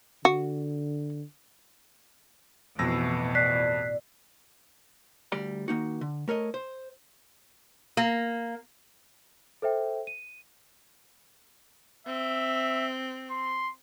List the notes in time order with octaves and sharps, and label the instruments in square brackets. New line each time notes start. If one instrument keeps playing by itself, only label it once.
[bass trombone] D3 [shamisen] F#4
[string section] A1 B2 E3 [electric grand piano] F2 E6 A#6
[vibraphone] D5 [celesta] F#6 B6 C7
[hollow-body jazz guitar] D2 G3 D5 A#5
D#3 A#3 D#4 F#4
D3
A3 A#4 C#5 D#5
C5
[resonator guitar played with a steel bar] A#3
[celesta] A4 C5 E5 G5
D#7
[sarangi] C4 [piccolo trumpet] E5
[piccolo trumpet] C6